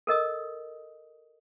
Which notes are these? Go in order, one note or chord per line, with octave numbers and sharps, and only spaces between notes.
A4 A#4 D#5 D#6